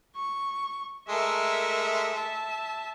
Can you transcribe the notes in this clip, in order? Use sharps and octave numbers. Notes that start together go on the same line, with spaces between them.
C#6
G#3 A3 A#4 E5
E5 A5